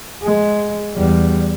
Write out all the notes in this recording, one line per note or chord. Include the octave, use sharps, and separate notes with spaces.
G#3
E2 G3